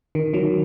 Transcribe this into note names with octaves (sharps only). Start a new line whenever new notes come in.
D#3
D#3 F#3